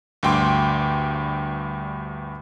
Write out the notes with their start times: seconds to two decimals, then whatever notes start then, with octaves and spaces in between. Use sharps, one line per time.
0.23 D2 G2 G5 C6 D6